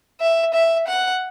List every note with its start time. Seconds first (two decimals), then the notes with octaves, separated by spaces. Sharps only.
0.20 E5
0.53 E5
0.87 F#5